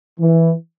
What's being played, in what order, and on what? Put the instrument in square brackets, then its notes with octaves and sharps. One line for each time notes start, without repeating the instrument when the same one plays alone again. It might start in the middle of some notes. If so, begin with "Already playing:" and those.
[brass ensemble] E3